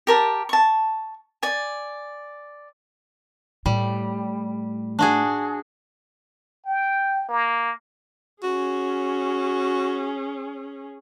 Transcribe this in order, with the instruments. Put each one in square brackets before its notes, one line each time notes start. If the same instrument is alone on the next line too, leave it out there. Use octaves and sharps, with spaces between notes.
[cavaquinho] G4 A#4 A5
A5 C#6
D5 G#5
[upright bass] A2 [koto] G3
[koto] D4 F#4 G#4
[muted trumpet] G5
A#3
[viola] C#4 G#4 [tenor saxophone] F#4